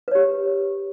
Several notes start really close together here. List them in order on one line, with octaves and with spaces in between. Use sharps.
B4 C#5 G4